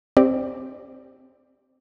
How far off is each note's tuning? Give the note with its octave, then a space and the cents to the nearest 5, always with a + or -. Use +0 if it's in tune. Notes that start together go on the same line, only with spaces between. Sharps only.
C4 +0 G4 +0 D5 +0